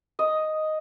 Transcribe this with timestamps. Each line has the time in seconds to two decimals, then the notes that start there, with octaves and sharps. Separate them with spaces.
0.19 D#5